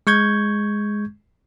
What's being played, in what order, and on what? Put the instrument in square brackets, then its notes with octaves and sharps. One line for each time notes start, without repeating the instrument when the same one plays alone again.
[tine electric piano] G#3 C#6 G6 G#6